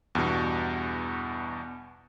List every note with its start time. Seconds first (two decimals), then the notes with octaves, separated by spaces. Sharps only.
0.15 E2 G2 B2